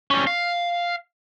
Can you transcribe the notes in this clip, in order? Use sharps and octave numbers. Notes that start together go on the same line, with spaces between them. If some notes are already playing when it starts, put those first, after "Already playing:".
G3 C#4
F5